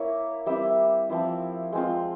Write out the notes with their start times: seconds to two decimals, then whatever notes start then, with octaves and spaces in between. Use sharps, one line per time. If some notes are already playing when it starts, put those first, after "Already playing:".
Already playing: A#3 E4 C#5
0.46 G3 C4 E4 E5
1.10 F3 C4 E4
1.72 G#3 C4 F4